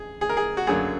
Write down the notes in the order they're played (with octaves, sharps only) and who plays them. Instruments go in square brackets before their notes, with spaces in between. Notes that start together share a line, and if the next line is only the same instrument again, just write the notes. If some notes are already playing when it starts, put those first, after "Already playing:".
Already playing: [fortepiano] G#4
G#4
A#4
G#4
F#4
F#2 D3 F#3 A#3 G#4